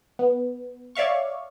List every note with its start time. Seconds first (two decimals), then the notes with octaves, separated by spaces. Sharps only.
0.19 B3
0.95 C#5 D5 E5 F5 C#6